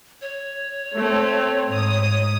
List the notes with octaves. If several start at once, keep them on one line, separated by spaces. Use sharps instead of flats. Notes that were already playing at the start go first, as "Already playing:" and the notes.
C#5
A3 C4
G#2 D#6